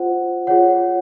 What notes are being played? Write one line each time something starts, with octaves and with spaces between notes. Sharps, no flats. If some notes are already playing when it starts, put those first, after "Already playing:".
Already playing: F4 C5 F#5
F4 G#4 C#5 F#5